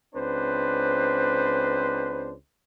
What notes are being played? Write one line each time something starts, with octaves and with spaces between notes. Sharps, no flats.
C#2 C4 D4 B4 C5